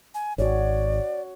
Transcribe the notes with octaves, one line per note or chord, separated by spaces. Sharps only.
G#5
G#1 F#4 C#5 D5